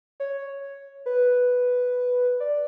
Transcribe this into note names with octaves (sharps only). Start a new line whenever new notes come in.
C#5
B4
D5